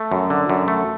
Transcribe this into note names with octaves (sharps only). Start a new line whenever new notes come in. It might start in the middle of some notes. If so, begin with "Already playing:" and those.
Already playing: A3
F#2
D3
F#2
A3